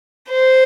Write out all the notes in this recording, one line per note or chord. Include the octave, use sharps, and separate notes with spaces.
C5